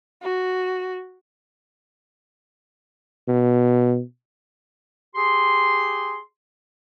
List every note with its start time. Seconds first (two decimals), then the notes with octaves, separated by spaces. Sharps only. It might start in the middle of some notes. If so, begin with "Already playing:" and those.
0.22 F#4
3.28 B2
5.15 G4 G#4 C6